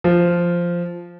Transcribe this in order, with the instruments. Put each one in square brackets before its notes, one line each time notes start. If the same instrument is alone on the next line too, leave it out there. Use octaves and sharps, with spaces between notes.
[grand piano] F3